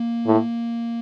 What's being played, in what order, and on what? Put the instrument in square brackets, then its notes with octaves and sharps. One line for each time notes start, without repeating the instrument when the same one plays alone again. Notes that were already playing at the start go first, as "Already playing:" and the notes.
Already playing: [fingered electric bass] A#3
[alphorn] A2